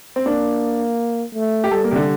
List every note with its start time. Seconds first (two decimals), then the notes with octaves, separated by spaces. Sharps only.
0.16 C4
0.26 A#3 D4
1.35 A3
1.64 G4
1.71 G3 A4
1.84 A#3
1.91 C3
1.96 D3